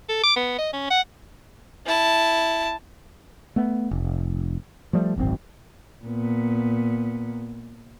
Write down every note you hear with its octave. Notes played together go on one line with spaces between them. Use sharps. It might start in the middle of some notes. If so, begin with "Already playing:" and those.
A4
D6
B3
D#5
C#4
F#5
E4 A5
A3 B3
F1
F3 G3 A3
D1 G#1 F#2 C4
A#2 B3